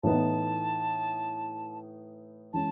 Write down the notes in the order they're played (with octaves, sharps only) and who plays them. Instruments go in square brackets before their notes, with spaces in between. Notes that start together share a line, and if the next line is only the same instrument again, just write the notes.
[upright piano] A2 E3 B3 D#4 [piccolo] A5
[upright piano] E3 G#3 C#4 [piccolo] A5